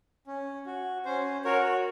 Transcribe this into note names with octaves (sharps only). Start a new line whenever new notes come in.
C#4
F#4
C#4 C5
F#4 A#4 C#5